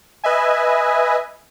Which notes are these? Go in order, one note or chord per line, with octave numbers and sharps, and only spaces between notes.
B4 D#5 E5 G#5